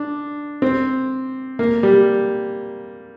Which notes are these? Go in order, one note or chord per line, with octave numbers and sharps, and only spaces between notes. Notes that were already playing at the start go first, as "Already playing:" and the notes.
Already playing: D4
C4
A#3
G3